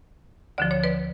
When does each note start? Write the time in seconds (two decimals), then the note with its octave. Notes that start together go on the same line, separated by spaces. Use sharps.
0.58 D2 D3 F3 D5
0.71 C#5
0.84 B4 D5